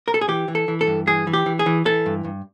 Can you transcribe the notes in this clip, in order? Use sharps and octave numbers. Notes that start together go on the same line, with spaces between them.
A#4
A4
G#4
E3 G4
E3
A4
E3
A4
G2
E3 G#4
E3
G4
E3
G#4
E3
E3 A4
G2
G2